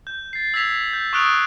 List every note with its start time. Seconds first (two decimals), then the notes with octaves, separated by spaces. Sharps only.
0.07 G6
0.33 A6 C7
0.54 E6 G#6 B6 F7
0.93 G6
1.13 C#6 D#6 F6 F#6 D7 F7